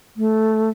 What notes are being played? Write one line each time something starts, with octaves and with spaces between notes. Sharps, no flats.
A3